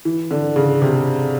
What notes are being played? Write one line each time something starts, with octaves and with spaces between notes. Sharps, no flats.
E3
D3
C#3
C3